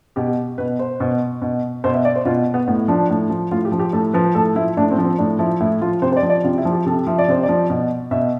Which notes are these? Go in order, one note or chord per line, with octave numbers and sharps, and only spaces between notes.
B2 G4
B2 B4
C5
B2
B2
B2 C5
E5
D5
C5
B2 F4
B3
A2 B3
F3 D4
A2
F3
A2 F4
G4
F3
G4
A2 A4
F3 B4
A2 A4
F3 E4
A2 D4
C4
F3
C4
A2 D4
F3 E4
A2 E4
F3 F4
C3 C5
C5
D5
F3
D5
C3 F4
E4
F3
G4
C3 A4
F3 E5
D5
C3 C5
D5
F3
B2
B2 E5